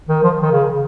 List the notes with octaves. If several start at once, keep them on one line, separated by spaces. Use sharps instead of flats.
D#3
F3
D#3
C#3